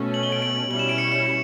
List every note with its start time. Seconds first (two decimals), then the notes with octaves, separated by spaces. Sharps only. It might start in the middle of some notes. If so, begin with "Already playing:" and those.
Already playing: B2 A3 C#4
0.14 F#7
0.23 G7
0.32 D7 F#7
0.42 D7 F#7
0.70 B2 G3 C#4 E4 F#7
0.79 E7
0.89 D7
0.98 C#7 E7
1.12 C#7 E7